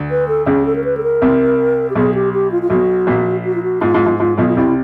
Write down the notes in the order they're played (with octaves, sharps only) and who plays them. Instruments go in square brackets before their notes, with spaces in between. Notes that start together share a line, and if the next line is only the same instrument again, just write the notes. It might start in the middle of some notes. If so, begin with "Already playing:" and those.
Already playing: [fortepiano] D2 D3
[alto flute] B4
A4
[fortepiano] C#2 C#3 [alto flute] G#4
[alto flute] A4
A#4
B4
A4
A#4
[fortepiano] C2 C3
[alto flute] G4
[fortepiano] B1 B2 [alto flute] G#4
[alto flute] G4
G4
F4
F4
[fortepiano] B1 B2 [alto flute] F#4
[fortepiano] A#1 A#2
[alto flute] F#4
F4
F#4
[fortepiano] G#2 [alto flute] F4
[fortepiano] G#2
G#2
[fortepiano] G#2 [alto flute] F4
[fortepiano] B1 B2 [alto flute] F4
[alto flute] F4
[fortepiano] C2 C3 [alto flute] E4